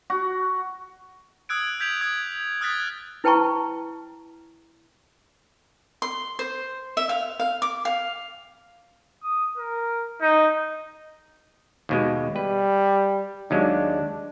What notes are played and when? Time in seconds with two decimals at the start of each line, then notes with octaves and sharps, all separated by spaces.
0.10 F#4
1.49 D#6 E6 F#6 G#6 D7
1.80 G6 G#6 B6 D7 F7
2.01 D#6 G#6
2.61 D#6 F6 F#6 G#6 A6 B6
3.24 E4 B4 G5 A5 A#5 C#6
6.02 C6
6.39 C5
6.97 E5
7.09 F5
7.40 F5
7.62 D6
7.85 F5
9.23 D#6
9.58 A#4
10.21 D#4
11.89 D#2 B2 G#3
12.36 G3 B4
13.51 D#2 F#3 G#3 D4